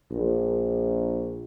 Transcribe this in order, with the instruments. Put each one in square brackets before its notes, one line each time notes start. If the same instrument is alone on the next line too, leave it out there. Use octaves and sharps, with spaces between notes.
[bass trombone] A#1